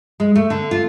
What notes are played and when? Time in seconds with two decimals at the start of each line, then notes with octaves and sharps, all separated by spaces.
0.20 G#3
0.36 A3
0.50 D3
0.71 F4